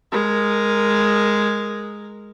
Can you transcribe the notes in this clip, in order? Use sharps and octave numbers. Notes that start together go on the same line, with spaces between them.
G#3 A#4